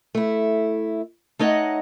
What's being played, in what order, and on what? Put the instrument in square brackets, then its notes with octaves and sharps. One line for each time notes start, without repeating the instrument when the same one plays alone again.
[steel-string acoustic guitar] A3 E4
A3 D#4 C#5 D#5 F#5